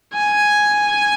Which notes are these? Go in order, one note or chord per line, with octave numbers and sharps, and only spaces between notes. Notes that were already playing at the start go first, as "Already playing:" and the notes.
G#5